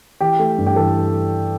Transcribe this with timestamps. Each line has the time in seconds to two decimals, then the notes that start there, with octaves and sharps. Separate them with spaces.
0.21 E3 G4
0.39 A3
0.58 G2
0.66 G4
0.76 E3 A4